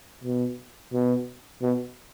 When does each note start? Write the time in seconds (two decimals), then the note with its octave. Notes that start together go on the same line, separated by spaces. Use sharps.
0.24 B2
0.93 B2
1.62 B2